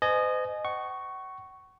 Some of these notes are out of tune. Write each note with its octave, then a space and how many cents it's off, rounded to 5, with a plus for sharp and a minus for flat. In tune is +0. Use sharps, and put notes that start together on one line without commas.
C5 -40 D#5 -20 G#5 +25
F#5 +40 C#6 +0